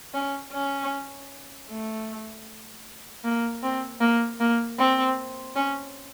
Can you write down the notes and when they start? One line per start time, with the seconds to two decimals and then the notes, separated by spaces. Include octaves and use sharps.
0.14 C#4
0.53 C#4
1.69 A3
3.24 A#3
3.63 C4
4.01 A#3
4.40 A#3
4.79 C4
5.56 C#4